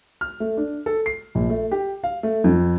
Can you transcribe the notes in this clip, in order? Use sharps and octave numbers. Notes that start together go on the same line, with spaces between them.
F6
A3
D4
A4
C7
A#1
A3
G4
F5
A3
F2